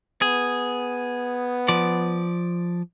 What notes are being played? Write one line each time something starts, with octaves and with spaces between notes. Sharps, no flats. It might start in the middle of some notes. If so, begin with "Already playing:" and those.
B3 G#4
F3 D5